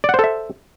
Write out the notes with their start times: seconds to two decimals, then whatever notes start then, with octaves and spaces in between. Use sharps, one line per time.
0.04 D5
0.09 F#5
0.14 C5
0.19 A4
0.24 E5